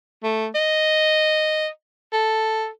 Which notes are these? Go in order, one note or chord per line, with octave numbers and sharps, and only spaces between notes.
A3
D#5
A4